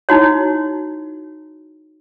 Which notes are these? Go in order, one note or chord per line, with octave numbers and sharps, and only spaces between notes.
D#4 E4 F#4 C#5